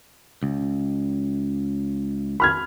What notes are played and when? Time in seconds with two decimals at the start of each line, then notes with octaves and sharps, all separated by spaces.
0.43 C#2
2.40 B5 F6 G#6